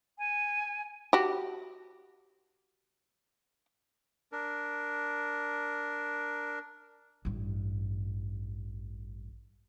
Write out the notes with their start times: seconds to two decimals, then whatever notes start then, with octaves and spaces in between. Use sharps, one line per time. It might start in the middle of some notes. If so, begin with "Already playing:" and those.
0.18 G#5
1.13 F#4 G4
4.32 D4 A#4
7.25 A1 G2